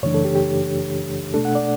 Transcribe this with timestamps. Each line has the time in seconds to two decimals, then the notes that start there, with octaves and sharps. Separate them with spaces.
0.03 F#2 C#3 E3 A3 D4 C#5
0.14 A4
0.25 G4
0.35 G4
1.34 B2 A3 D4 A4
1.45 F#5
1.55 D5